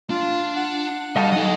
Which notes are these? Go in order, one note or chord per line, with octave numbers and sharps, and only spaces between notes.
D4 F4
F#5
G3 D#5 F5 A5
F#3 G3 D#4 D#5